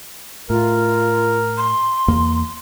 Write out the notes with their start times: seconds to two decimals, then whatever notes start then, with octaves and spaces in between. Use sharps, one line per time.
0.50 A2 F4 A#4
1.57 C6
2.08 E2 A#3